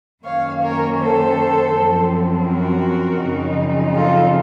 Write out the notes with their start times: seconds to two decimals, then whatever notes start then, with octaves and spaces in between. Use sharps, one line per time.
0.24 F#2 D#3 A#3 C#4 C#5 F5
0.61 A#4 C#5
0.98 A4 C5
1.73 F#2 F3 C4
2.47 F#4 A#4
3.20 F#2 C#3 F3 C4 D#4
3.94 F4 A4